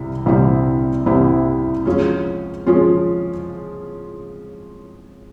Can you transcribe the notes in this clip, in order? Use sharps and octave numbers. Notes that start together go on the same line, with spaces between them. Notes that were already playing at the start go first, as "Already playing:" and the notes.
Already playing: C2 C3 G3 E4
C2 C3 G3 C4 E4
C2 C3 G3 C4 E4
F3 G#3 C#4 F4
F3 G#3 C#4 F4